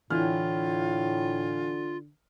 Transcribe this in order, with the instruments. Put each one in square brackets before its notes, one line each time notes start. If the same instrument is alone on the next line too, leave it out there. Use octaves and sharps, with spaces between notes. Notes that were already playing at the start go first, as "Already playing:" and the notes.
[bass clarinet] A2 [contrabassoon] D3 [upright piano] E3 F6 [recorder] F4